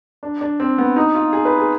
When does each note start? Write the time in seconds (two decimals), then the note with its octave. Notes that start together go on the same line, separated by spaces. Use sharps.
0.23 D4
0.41 D4
0.60 C4
0.78 B3
0.96 D#4
1.15 F4
1.33 G#4
1.45 B4
1.58 G#4